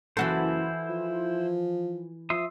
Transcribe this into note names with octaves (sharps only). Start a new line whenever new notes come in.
F#1 E3 E4 F#4 A4 C5
F3
F3 E5 C6 D#6